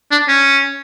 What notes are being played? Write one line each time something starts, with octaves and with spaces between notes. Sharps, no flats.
D4
C#4